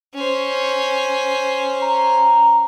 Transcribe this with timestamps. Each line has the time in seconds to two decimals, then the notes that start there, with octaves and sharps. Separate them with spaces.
0.14 C#4 C5
1.82 A#5